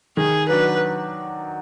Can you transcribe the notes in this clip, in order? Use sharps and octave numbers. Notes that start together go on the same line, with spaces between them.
D#3 G#4
F#3 D4 F#4 B4